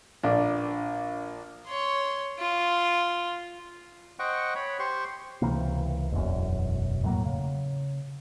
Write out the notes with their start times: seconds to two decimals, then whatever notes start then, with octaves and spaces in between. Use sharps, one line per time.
0.23 A#1 D4
1.66 C#5 C6
2.38 F4
4.19 C5 D#5 F#5 G5 C#6
4.55 C#5 B5
4.79 G4 C5 C6 C#6
5.42 C#2 C3 E3 A#3
6.12 E1 B1 F#2
7.04 A2 F#3 A#3
7.25 C#3